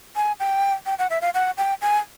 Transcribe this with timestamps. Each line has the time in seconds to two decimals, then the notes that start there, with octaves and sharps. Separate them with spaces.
0.16 G#5
0.40 G5
0.86 G5
0.99 F#5
1.10 E5
1.22 F5
1.34 F#5
1.58 G5
1.81 G#5